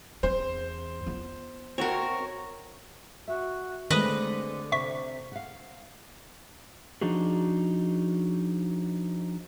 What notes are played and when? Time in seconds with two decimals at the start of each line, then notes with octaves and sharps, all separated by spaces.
0.23 E2 C4 C5
1.06 B3 F4
1.78 C4 F#4 A#4 C#5
3.28 F#4 E5
3.90 D3 D#3 G#3 A3 C4 B4 D#5
4.72 C3 E5 C#6 B6
5.32 F5 F#5
7.01 F3 D4 D#4 F#4 G#4